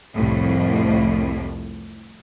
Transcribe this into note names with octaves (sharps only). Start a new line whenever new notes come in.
C2 F2 A2